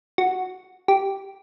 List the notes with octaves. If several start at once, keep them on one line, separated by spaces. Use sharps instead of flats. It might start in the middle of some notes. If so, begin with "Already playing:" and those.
F#4
G4